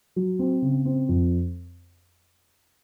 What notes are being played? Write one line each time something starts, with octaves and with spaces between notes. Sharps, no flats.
F#3
C4
C#3
C4
F2